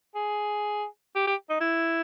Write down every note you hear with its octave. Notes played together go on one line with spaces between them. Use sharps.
G#4
G4
G4
D#4
E4